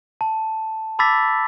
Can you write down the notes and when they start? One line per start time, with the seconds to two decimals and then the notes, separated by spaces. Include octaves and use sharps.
0.21 A5
0.99 A5 B5 D6 E6 A6 B6